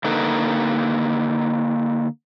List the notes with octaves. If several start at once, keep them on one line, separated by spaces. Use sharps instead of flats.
D3 A#3 D#4 A4 B4